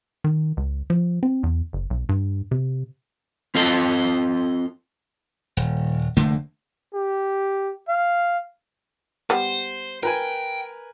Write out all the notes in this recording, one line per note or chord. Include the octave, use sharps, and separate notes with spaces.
D#3
C#2
F3
C4
E2
F#1
B1
G2
C3
C4 F4 A4 D#5
D#1
F1 D3 A3 A#3
G4
F5
G3 B3 C5
A#4 B4 G5 G#5